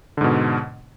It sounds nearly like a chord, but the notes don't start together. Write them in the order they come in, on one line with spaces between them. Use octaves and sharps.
D3 G#2 B2